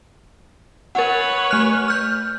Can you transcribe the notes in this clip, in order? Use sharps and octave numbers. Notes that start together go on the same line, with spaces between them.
A#4 B4 C#5 F#5
A3 F6 F#6
F6 G6